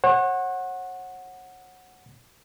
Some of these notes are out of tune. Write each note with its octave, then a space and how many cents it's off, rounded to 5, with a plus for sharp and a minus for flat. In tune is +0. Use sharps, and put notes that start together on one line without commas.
C#5 -40 F#5 -5